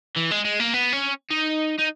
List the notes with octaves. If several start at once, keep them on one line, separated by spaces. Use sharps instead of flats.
E3
G#3
G#3
A#3
B3
C#4
D#4
D#4